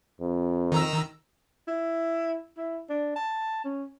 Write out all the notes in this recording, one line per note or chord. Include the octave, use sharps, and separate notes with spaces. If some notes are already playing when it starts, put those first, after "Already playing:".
F2
D#3 A#5 E6
E4
E4
D4
A5
C#4